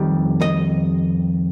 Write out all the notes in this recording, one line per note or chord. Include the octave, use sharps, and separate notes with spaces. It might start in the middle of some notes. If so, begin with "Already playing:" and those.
Already playing: F2 D#3 G3
D#5